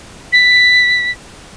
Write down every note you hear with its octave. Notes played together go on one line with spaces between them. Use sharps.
B6